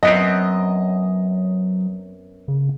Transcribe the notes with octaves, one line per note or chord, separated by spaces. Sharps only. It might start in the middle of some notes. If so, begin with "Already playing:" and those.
F#2 F#3 B3 C4 D#5
C#3